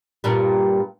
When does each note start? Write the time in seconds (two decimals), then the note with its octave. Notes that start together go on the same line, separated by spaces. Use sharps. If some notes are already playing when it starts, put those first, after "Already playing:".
0.24 G2 A#2 G3